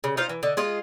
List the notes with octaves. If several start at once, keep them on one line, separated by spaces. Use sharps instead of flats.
C#3
D#4 F4 C5 F5
E3
D3 D#5
G#3 F4 D#5